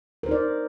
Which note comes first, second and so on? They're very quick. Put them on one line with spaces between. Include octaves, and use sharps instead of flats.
A#4 C5 D#4 D5